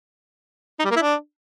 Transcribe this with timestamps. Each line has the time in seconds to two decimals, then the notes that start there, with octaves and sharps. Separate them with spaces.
0.79 D#4
0.85 G3
0.91 A#3
0.96 E4
1.02 D4